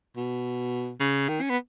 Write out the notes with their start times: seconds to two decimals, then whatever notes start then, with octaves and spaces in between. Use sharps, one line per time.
0.17 B2
1.00 C#3
1.29 D#3
1.41 C#4
1.49 B3